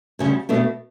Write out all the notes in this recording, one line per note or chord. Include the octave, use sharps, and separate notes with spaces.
D2 C#3 G3 C#4
B2 A3 D4